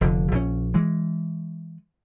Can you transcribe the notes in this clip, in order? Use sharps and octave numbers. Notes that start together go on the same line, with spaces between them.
F1 D3
A#1 D3 C#4
E3 G#3